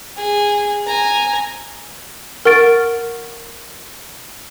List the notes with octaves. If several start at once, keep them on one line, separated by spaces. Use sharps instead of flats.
G#4
G#5 A#5
A#4 F#5 C#6 F6 A6 D7